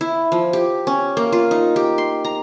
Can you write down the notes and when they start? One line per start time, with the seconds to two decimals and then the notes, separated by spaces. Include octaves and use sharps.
0.01 E4
0.32 F3
0.53 G4
0.87 C#4
1.17 A#3
1.32 F4
1.51 D#4
1.76 G4
1.98 C6
2.25 A#5